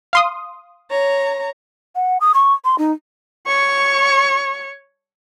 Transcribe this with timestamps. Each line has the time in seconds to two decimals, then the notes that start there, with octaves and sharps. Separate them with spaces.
0.13 F5 C6 D#6
0.90 C#5 A#5
1.96 F#5
2.21 D#6
2.34 C#6
2.65 C6
2.78 D#4
3.47 C#5 C#6